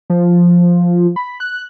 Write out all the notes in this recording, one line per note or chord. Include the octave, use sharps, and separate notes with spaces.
F3
B5
F#6